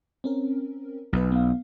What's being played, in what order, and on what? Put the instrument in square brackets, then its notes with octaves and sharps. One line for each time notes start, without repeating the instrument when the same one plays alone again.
[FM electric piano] C4 C#4 A#4
[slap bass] B1 [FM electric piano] F#3 D#4 B4
[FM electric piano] B3 F5